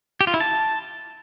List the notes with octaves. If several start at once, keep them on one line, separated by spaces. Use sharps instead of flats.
G4
F4
E4
A5